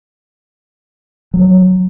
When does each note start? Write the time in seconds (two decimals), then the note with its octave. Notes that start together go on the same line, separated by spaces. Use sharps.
1.34 F#3